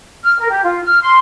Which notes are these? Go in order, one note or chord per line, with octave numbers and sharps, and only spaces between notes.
F6
A#4
G4
F4
F6
C6